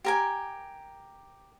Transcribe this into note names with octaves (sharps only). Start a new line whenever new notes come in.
G4 A#4 G#5